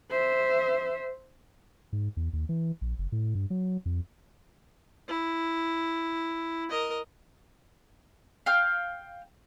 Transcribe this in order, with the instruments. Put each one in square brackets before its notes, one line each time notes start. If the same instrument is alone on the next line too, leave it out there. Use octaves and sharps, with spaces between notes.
[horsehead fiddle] C5 E5
[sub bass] G#2
E2
D#2
E3
A#1
F#1
A2
G2
F#3
F2
[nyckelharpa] E4
A#4 D#5
[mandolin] F5 G5 F6